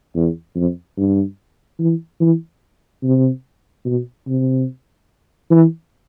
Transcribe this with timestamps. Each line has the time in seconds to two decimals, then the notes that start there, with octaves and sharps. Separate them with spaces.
0.15 E2
0.55 F2
0.97 G2
1.80 E3
2.20 E3
3.03 C3
3.85 B2
4.27 C3
5.51 E3